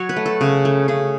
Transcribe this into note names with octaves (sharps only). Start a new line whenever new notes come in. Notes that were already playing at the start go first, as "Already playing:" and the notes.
Already playing: F#3 C#5
B4
A3
A4
C#3
A3
C#3 G#4